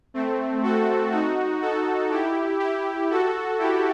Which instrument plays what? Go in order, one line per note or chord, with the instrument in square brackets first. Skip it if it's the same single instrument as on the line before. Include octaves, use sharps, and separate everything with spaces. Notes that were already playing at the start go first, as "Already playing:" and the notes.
[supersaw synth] A3 C4
F#4 A4
D#4 F#4
F#4 A4
E4 G4
E4 G4
F#4 A4
E4 G4